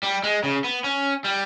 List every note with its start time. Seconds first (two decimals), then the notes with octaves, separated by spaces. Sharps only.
0.03 G3
0.23 G#3
0.44 C#3
0.64 B3
0.84 C#4
1.24 G3